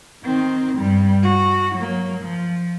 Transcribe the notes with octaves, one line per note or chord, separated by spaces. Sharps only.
D#3 C4
G2 G3
F#4
F#3 A#3
F3